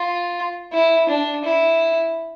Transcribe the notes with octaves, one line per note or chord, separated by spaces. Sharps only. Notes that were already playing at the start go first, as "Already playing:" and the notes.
Already playing: F4
E4
D4
E4